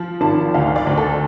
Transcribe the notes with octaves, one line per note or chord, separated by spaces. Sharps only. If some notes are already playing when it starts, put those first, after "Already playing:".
Already playing: F3
G#1 A5
D2 F5
D5
D2
A4